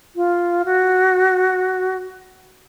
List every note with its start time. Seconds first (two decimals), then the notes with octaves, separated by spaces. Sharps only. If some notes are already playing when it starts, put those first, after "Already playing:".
0.16 F4
0.65 F#4